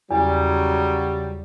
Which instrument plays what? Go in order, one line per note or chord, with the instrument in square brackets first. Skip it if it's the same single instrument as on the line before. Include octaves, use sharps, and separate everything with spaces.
[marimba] E2 [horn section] C#3 F#3 G3